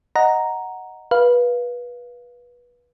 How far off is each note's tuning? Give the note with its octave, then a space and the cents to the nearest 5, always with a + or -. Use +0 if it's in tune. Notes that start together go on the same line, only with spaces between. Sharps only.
D#5 +0 F#5 +0 A#5 +0
B4 -20 F5 +0